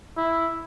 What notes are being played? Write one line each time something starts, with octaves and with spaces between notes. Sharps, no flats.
E4